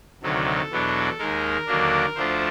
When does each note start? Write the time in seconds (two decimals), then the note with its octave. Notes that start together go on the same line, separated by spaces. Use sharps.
0.23 D2 C3 D#3 F#3 A4
0.71 E2 B2 F#3 B3 D4
1.19 D#2 D#3 G#3 A#4
1.67 D#2 D3 F#3 A#3 D4
2.16 D2 D3 F3 A3 D4 C5